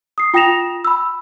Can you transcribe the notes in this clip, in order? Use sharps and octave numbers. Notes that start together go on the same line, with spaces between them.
D#6 C7
F4 G5 D#6 A#6 E7 F7
B5 E6